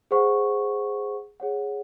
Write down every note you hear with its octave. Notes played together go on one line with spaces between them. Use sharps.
G#4 C5 F#5 C#6
G#4 C#5 F#5